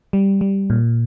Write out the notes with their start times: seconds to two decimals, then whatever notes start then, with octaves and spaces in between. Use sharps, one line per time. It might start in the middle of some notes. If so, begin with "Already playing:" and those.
0.13 G3
0.41 G3
0.70 A#2